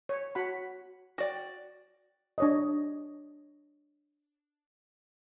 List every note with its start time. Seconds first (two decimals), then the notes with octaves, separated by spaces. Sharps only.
0.09 C#5
0.35 F#4 F#5 B5
1.18 F#4 D5 G5
2.38 D4 C#5 D#5